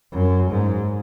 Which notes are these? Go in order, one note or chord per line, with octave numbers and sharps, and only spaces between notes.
F#2
G#2